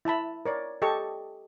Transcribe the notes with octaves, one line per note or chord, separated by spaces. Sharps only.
E4 E5 A5 B5
A#4 C#5 D5
G4 A4 D#5 A5 C#6